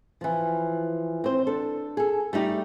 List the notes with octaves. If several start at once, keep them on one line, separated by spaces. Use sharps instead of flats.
E3 F3
C4 C5
D4 A4
G#4 A4
G3 A3 D#4 G4